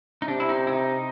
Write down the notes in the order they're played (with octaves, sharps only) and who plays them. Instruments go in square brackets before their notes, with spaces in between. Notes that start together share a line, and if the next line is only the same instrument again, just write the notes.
[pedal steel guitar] D#4
[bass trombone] C3 [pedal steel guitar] D4
[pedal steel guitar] E4
D#4
E4
D#4